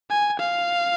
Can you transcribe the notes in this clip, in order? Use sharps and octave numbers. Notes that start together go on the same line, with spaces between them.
G#5
F5